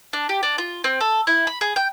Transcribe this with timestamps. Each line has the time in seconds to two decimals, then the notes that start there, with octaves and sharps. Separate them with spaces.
0.13 D4
0.29 G4
0.43 D4
0.58 F4
0.84 C4
1.01 A4
1.27 E4
1.47 B5
1.61 G#4
1.76 G5